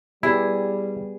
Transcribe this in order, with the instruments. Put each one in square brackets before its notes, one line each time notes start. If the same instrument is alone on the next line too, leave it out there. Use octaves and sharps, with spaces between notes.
[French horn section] G3 [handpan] B3 G4 D5 [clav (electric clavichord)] E4 [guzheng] G#4